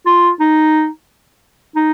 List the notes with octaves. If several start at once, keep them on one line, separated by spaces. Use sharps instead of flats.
F4
D#4
D#4